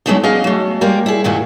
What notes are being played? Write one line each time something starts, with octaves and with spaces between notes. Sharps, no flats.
F#3 G#3 A3 B3 D4 D#4
B3 C#4 G4 G#4 D#5 F5
F#3 A3
G3 G#3 A#3 A#4
E4 G#4
G2 A#2 D#3 G#3 E4 F#4